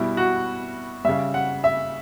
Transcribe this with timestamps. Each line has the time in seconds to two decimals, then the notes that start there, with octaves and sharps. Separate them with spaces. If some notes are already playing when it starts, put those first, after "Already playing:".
Already playing: B2 G3 E4
0.17 F#4
1.05 C#3 G3 E5
1.34 F#5
1.64 E5